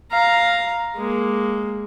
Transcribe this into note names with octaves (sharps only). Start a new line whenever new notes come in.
F5 A#5
G#3 A#3